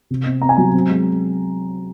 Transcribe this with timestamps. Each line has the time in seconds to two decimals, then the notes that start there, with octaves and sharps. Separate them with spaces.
0.10 C3
0.26 C4
0.42 C4 A#5
0.49 G#5
0.57 F#3 A#5
0.74 C4
0.90 G#3